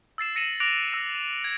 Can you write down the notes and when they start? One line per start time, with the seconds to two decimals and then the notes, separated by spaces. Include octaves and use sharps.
0.18 E6 A6 C7 E7
0.35 E6 A#6 C#7 D#7 E7 F#7
0.60 D6 F#6 A#6 D7 F7
0.92 E6 A#6
1.44 G#6 D7